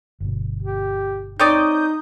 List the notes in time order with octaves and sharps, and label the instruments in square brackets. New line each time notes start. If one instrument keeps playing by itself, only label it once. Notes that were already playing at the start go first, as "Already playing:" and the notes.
[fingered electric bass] G1 B2
[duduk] G4
[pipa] C4 C#5 D5 [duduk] D#4 [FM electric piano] D#6 G6